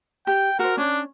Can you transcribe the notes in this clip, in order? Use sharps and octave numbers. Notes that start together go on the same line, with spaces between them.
G4 G5
F#4 A#4 C5
C#4 D4